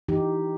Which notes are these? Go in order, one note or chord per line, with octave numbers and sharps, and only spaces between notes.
E3 D#4 G4